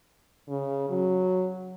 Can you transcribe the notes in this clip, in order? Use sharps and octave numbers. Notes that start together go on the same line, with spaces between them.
C#3
F#3